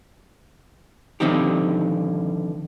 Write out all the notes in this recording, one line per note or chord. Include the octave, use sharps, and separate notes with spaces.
D3 D#3 F3 C4 D#4 G4